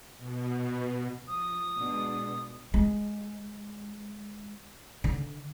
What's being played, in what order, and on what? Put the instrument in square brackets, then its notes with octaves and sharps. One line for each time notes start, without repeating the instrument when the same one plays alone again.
[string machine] B2
[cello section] F3 [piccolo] D#6
[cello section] B2 G#3 D4
[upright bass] G#3
D3